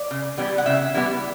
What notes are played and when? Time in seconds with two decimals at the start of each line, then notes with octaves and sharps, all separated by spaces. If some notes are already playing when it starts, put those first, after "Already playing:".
Already playing: D5
0.11 C#3
0.37 E3 G3 B3
0.58 F#5
0.66 C#3 E5
0.94 E3 G3 B3